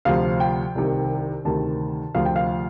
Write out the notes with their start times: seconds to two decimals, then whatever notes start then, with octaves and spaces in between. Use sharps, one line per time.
0.05 D2 C3 F3 F5
0.40 G5
0.75 C2 C3 D#3
1.45 D2 C3 D#3 A5
2.15 D2 C3 F3 F5
2.26 G5
2.36 F5